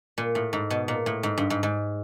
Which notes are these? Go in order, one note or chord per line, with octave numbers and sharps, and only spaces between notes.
A#2
A2
G#2
B2
A#2
A2
G#2
G2
G#2
G#2